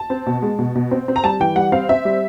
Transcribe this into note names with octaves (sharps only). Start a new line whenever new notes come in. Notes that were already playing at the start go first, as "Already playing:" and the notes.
Already playing: A5
C4
B2
G#3
B2
B2
C4
C4
A#5
G3 A5
E3 G5
G3 F#5
C4 F5
C4 E5
G3